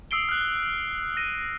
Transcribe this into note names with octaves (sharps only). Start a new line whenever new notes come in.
D#6 E6 C7 D7 G7
F6 F#6
A#6 D#7